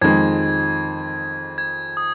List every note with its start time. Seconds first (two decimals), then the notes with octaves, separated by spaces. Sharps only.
0.01 F2 D#3 G#3 G#6
1.58 G#6
1.97 D#6